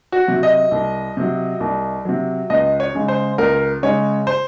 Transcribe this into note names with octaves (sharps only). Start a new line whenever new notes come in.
F#4
C3 F#3
D#5
C2
C3 F#3
C2
C3 F#3
C#2 D#5
C#5
C#3 G#3
C5
C#2 A#4
C#3 G#3 C#5
C5